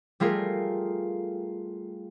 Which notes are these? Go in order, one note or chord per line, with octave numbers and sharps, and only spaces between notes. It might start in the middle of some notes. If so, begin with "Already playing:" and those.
G3 A3 F4 G#4 A#4